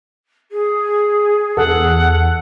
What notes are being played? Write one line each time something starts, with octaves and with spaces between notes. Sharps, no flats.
G#4
E2 A4 F#5